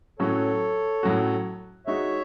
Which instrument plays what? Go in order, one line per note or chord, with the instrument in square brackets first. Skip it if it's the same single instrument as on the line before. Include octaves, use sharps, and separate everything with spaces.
[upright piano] A2 F#3 C#4 F#4 [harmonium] A4 C#5
[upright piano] A2 F#3 C#4 F#4
[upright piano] G#3 D#4 F#4 [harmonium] C#5 E5